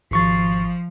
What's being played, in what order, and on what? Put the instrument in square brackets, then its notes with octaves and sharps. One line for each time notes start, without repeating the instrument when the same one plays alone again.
[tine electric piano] G#1 C#6 A6 [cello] F3